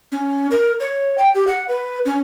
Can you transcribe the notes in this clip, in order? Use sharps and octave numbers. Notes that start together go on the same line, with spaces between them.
C#4
A#4
C#5
G5
G4
F#5
B4
C#4